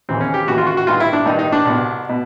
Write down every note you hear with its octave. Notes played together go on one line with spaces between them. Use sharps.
D#2 C#3 E3 C4
C#4
G4
D#2 C#3 E3 F#4
F4
F#4
F#4
G2 D#3 F4
E4
D4
G2 D#3 D#4
D#4
D4
C2 B2
B2